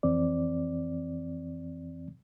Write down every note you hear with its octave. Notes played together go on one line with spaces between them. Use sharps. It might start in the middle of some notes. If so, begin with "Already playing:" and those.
F2 E3 C4 D5